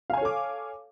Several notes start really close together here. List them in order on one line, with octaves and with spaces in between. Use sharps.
F5 G#5 C#5 A4 D6